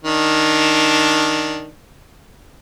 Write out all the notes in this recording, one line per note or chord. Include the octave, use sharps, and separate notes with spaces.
D#3 D4